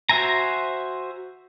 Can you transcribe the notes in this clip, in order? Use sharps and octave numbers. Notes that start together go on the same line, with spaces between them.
F#4 C5 E5 G#5 A#5